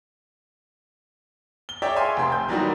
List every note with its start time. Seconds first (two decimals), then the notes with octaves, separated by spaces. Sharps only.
1.69 G7
1.82 G#4 C#5 D5 E5 G5
1.96 E5 F5 G#5 C6
2.17 F1 G5 C6
2.32 G6
2.48 E3 F#3 G3 A#3 D#4 F#4